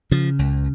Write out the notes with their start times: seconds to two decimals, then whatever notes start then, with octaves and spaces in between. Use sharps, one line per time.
0.11 C#3 F3
0.39 C#2